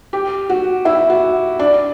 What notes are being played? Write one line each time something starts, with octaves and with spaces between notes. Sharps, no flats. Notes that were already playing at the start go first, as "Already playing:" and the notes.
G4
F#4
E4
F#4
D4